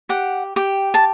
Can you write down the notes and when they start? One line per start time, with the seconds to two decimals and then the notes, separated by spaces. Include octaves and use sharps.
0.09 G4 F#5
0.56 G4 G5
0.94 A5